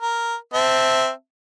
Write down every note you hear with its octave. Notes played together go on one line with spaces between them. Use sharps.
A#4
C4 E5 A5